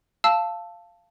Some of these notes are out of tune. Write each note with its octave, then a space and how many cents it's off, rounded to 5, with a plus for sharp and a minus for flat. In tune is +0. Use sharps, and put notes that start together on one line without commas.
F5 -10 A5 +0 E6 +0